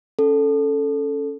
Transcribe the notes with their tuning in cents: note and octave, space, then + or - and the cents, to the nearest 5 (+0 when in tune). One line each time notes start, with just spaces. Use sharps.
C#4 +0 A4 +0